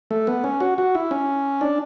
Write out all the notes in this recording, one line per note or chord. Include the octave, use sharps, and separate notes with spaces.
A3
B3
C#4
F#4
F#4
E4
C#4
D4